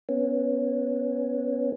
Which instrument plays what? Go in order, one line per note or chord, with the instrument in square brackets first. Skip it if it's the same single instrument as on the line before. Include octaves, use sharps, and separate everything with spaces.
[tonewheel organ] B3 C#4